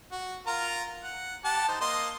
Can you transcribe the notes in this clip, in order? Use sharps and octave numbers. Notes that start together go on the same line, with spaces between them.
F#4
F4 A#4 A#5
F#5
G4 F#5 A5
D#4 C5
A#3 D#5 C6